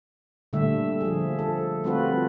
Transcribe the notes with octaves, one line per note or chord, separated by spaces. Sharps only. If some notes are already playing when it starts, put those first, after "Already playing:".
A#2 D3 G3 A3 E5
F3 G#4
A4
G3 A3 C4 F4 F#4 B4